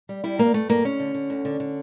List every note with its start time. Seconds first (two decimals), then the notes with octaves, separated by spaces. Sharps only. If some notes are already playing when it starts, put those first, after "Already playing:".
0.09 G3
0.24 G3 E4
0.39 G2 A#3
0.54 G2 A3
0.69 G2 A#3
0.84 D2 C#4
1.00 D3
1.14 D3
1.30 D2
1.45 D3
1.60 D3